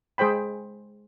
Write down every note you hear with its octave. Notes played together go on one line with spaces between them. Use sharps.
G#3 G#4 C5 G5 B5